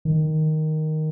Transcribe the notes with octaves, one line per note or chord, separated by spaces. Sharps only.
D#3